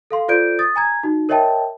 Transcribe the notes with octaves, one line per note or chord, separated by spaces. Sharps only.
A4 F5 C6
F4 A4 C5 D5 G6 D7
D#6 A6
G#5 A#5 G#6
D#4 F#4
A#4 C#5 D#5 E5 G5 A5